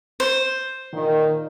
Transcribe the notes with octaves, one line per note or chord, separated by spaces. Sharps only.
C5
A#2 D#3